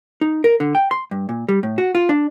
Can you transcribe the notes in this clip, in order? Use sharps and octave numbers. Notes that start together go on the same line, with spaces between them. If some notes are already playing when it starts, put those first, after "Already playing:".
D#4
A#4
D3
G5
C6
G2
A#2
G3
A2
F#4
F4
D4